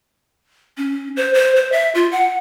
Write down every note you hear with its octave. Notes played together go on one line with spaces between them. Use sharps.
C#4
C5
C5
C5
E5
F4
F#5